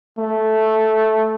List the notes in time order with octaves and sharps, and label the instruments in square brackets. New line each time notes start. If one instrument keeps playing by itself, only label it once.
[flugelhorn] A3